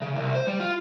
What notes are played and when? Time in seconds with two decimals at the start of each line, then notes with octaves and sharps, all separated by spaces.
0.02 C#3
0.15 C2
0.35 C5
0.47 G3
0.60 F4